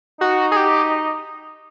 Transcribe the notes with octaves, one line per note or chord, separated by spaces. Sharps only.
D#4 F#4
G#4
G4